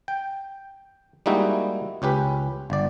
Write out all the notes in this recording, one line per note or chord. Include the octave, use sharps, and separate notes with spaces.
G5
G3 G#3 A#3 D#4 E4 F#4
C#2 C#4 G4 B4
G1 D5